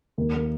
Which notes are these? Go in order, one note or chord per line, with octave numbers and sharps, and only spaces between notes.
D#2
A#3